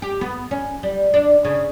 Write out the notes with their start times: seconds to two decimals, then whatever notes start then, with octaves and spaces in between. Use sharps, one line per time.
0.02 G4
0.21 B3
0.51 C#4
0.83 G3
1.14 D4
1.45 C#3